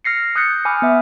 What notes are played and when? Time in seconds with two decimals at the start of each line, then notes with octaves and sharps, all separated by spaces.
0.05 F6 A#6 C7 C#7
0.36 D#6 F#6 G6 A6 C#7
0.65 G#5 B5 D6 D#6 F6
0.82 B3 E5